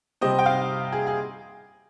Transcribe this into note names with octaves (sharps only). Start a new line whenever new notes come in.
C3 G3 C4 D#5
G5
F5
G#4
G#4